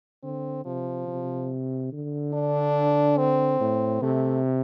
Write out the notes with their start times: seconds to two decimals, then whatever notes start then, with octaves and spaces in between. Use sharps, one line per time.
0.23 D3 C4
0.65 C3 F3
1.07 C3
1.92 D3
2.34 D4
3.18 C4
3.60 A2
4.02 C3 A3